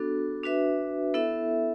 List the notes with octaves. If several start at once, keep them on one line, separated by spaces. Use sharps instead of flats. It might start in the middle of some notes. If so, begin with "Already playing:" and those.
Already playing: B3 D4 F#4 A4
D4 F#4 B4 E5
B3 E4 A4 E5